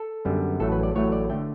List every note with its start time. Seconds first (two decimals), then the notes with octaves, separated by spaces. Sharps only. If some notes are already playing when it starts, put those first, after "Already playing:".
Already playing: A4
0.25 F#2 D3 G3 B3
0.60 A1 A2 F#3 A3 A4
0.72 B4
0.83 D5
0.95 A1 A2 F#3 A3 C#5
1.12 D5
1.30 D3 A3 G5